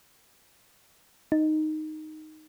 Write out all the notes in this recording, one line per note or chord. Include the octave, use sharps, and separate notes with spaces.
D#4